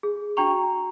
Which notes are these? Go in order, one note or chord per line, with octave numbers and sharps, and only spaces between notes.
G#4
D4 F#4 G5 A#5 C#6 F7